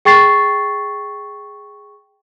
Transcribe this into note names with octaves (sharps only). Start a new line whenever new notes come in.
G#4 G5 C#6 A6 C7